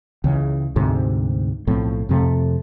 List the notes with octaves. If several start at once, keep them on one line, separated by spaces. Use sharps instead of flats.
C#2 C#3 E3
D2 G#2 C3
B1 A2 F3 C4
F2 C3 A3